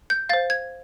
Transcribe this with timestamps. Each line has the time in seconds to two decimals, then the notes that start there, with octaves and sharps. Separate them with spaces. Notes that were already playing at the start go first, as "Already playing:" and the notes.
0.10 G6
0.29 C5 F5 A6
0.50 G#6